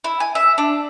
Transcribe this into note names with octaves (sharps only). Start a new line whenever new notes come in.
E4
G#5
E5
D4